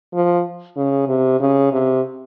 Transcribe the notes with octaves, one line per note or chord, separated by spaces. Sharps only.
F3
C#3
C3
C#3
C3